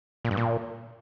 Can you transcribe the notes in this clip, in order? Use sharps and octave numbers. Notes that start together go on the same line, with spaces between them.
A#2
G2
A#2